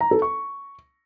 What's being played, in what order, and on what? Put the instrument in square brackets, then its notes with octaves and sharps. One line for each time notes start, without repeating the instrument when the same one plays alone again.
[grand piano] A#5
A4
C#6